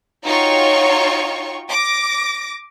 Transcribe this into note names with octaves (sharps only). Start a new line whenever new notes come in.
D#4 F4 F#4 C#5 G5 C#6
D6 A#6